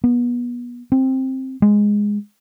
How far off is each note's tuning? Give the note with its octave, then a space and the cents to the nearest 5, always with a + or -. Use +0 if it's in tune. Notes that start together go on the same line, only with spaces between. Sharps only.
B3 -30
C4 +10
G#3 -5